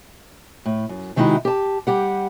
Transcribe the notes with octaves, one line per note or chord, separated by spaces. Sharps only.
A2
F#2
C3 D#3 G#3 D#4 E4 F#4
G4 A5
G3 G4 F#5